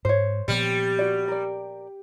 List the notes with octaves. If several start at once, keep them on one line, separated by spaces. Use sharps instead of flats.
G#2 C5 C#5
A#2 F3 G3 B3
F#4 D5
A#4 D5